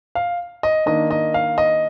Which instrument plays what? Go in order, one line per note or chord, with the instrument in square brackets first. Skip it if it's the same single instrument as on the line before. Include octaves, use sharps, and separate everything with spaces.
[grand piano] F5
D#5
D#3 A#3 D4 D#5
D#5
F5
D#5